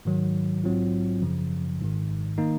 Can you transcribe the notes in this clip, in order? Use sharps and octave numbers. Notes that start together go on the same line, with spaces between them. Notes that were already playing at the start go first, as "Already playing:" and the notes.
G#2 D#3 F#3
A#1 G#2 F#3 C4 F4
F#2 C#3 F3
G#1 G#2 D#3
D#3 A#3 D#4